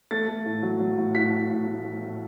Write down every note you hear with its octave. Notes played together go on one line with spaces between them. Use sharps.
A3 A6
A3
A2
F#3
F#3
A2
A2 B6
A2
A2
A2
A2
A2